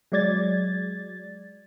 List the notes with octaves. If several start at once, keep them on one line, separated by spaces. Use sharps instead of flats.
F#3 G#3 D5 G#6 A6